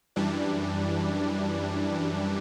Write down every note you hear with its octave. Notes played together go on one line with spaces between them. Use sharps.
F#2 E3 G3 D4